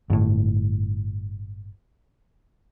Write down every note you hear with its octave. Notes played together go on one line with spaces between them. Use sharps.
G1 A2